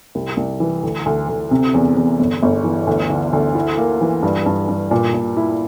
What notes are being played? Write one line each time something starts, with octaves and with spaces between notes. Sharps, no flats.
C2
C2
E3
D2
D2
D2
C3
E2
E2
G1
G1
E3
D2
D3
D2
E4
A#3
E3
G2
G2
G2
A#2
A#2
E4